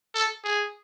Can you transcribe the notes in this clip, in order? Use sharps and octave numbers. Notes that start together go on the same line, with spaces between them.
A4
G#4